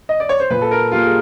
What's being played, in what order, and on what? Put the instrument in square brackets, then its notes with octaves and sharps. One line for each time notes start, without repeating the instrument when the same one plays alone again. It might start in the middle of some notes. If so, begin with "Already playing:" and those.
[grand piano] D#5
D5
C#5
C5
A#2 B4
A4
A#4
G3 A#3 F4
G#4